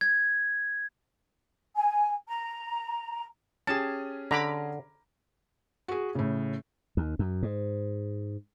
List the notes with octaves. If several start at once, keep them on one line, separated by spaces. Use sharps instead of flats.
G#6
G#5
A#5
C#4 G4 G#4 A5
D3 A#5 B5 D6
F#4 G#4
A2 C#3
D#2
F#2
G#2